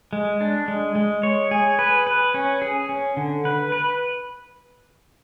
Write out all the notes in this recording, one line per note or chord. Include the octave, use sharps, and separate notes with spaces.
G#3
D4
G#3
G#3
C#5
G#4
B4
B4
C#4
G#4
C#4
D3
B4
B4